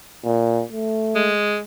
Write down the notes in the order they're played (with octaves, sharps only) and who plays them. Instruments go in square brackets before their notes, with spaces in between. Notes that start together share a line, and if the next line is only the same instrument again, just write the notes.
[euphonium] A#2
A3
[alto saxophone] G#3